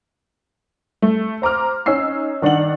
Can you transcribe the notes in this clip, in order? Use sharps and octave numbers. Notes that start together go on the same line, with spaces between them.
A3
C5 A#5 D6 F6
C#4 D#4 E6 C7
D#3 D4 D5 F#5 F#7